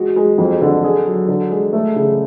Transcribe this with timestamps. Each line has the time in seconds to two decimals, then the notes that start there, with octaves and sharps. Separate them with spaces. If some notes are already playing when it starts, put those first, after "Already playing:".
Already playing: G#3 F#4
0.16 G#3
0.38 F2
0.61 D3
0.84 G#4
1.06 F#3
1.28 D3
1.51 G#3
1.73 A3
1.96 C#3